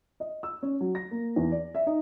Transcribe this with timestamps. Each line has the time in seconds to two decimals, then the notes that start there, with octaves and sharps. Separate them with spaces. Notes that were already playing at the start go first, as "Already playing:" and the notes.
0.20 D#5
0.43 E6
0.63 C#4
0.81 F#3
0.95 A#6
1.11 A#3
1.36 E2
1.52 D5
1.75 E5
1.87 D#4